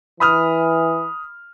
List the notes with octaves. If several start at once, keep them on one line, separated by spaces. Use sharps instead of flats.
E3 B5 D#6 F6